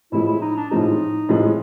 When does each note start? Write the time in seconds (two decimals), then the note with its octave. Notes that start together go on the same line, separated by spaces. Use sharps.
0.12 A2 F3 G#3 E4
0.27 E4
0.41 D#4
0.56 D4
0.71 A2 F3 G#3 D#4
1.29 A2 F3 G#3